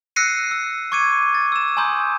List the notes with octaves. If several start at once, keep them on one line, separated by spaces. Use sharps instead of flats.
E6 F#6 A#6 C7 C#7 D#7
E6
C#6 D6 G#6 C#7 D#7
A6
E6 E7
G#5 A#5 C6 D#6 G6